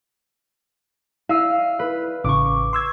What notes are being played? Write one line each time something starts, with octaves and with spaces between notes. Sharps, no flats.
E4 F5 E6 D#7
B4
A1 C#3 C#6 D6
C6 E6 G#6